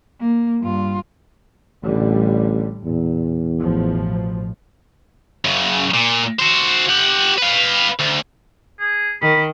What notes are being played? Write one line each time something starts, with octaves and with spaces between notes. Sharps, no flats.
A#3
G2 F4
A1 A2 D3 G3
E2 A#2
A1 B2 F3
F#2 C#3
A#2
F#4 C5
G4 F#5
B4 F5
D2
G#4
D#3 B5